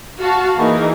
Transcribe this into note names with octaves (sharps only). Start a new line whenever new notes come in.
F#4 F5 A5
E3 A#3 D#4 G#4 A#4